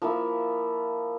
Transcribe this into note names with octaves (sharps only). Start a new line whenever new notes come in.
F3 A#3 E4